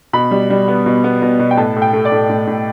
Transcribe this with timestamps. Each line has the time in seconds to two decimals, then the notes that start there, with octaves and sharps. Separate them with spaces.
0.13 B2 B5
0.31 G3
0.50 G3
0.68 B3
0.86 B2
1.04 B3
1.22 B2
1.39 B2
1.51 G5
1.57 A2 A5
1.76 A2
1.82 G5
1.93 A3
2.05 D5
2.12 A2
2.29 A2
2.47 A2